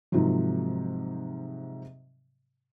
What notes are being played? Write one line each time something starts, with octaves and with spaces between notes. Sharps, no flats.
G#2 C3 D#3 F3 F#3